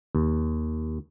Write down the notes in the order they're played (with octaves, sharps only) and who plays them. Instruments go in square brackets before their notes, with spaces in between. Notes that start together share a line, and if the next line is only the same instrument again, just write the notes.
[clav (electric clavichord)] D#2